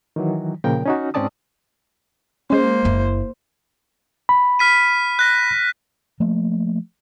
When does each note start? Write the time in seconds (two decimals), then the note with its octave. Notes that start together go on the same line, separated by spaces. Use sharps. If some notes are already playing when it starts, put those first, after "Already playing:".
0.16 D#3 E3 F#3
0.64 A#2 C#3 F3 A#4 G5
0.86 C#4 D#4 F#4
1.14 G#2 C4 C#4 D5 A5 D#6
2.50 G#3 A#3 C#4 C5
2.85 F#1 E4
4.29 B5
4.59 F6 B6 D#7
5.19 F#6 A#6
6.20 F3 A3 A#3